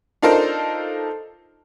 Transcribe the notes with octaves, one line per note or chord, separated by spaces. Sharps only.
D4 D#4 F4 A4 A#4 C5